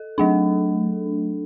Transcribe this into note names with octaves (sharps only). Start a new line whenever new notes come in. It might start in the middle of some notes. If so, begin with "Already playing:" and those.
Already playing: A4
F#3 A3 D4